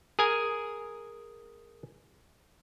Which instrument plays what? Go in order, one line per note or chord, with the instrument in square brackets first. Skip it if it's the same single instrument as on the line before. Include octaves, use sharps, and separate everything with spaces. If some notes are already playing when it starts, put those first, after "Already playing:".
[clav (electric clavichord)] G#4 A#4 G#5